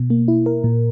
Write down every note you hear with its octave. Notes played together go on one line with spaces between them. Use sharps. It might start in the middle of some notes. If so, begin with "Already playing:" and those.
Already playing: B2
A#3
E4
A#4
A#2